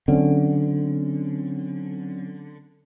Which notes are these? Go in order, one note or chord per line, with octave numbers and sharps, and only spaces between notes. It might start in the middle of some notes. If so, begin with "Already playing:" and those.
D3 F#3 C4 C#4